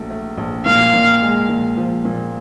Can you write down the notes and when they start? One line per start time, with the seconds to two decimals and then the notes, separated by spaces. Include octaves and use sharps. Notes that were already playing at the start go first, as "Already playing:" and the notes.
Already playing: A#1 F#3 A3
0.10 A3
0.37 A#1
0.65 A#2 F5
0.94 A#2
1.22 G#3
1.49 A#2
1.77 F3
2.05 A#2